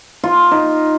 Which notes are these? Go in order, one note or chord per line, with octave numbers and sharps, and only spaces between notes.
F4
D#4